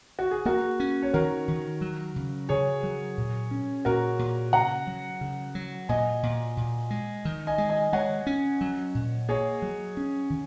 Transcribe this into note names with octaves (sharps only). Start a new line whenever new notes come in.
F#4
G#4
A#3 F#4 A#4
C#4
C#5
D#3 F#4 A#4
D#3
F#3
C#3
C#3 G#4 C#5
F#3
A#2
C#4
A#2 F#4 A#4
A#2
C#3 F#5 A#5
F#3
C#3
F#3
A#2 D#5 G#5
A#2
A#2
G#3
D#3
D#5 G#5
G#3
D#5 G#5
G#3 C#5 F#5
C#4
F#3
A#2
A#3 G#4 C#5
F#3
C#4
D#3